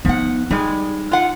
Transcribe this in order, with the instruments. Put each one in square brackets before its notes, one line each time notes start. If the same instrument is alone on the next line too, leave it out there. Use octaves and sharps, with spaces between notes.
[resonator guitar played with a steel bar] F3 F#5 [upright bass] B3 D#4
[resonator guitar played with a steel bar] G3 G#3 [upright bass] D#4
[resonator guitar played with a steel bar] F4 F#5